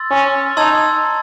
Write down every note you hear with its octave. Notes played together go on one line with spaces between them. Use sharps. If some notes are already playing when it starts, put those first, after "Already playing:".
Already playing: C6 E6 A6
C#4
D#4 A5 C6 E6 G#6